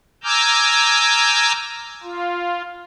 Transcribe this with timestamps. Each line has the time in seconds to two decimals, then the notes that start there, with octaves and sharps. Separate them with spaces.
0.24 G#5 A#5 D6 E6 F6 G6
2.03 F4